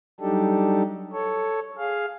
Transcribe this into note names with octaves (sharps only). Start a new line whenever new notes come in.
F#3 G3 D4 D#4 G4 A4
A4 C#5
G#4 F5